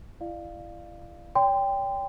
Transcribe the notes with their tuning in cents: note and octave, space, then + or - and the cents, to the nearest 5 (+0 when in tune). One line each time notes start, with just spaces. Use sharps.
E4 +35 D5 +35 F5 +0
C#5 +45 G5 +10 C6 -25